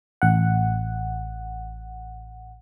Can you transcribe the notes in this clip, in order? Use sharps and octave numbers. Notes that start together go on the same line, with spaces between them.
A1 F#5